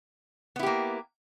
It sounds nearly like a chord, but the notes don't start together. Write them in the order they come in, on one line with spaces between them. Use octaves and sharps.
B3 E4 G4 A#3